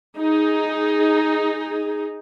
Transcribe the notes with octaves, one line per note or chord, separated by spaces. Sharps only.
D#4 G#4